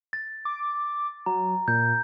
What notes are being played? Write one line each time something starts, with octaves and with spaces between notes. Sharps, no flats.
A6
D6
F#3 A#5
A#2 G6